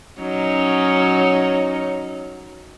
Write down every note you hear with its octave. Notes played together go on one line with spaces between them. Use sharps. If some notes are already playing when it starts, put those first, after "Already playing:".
F#3 C#4 D#4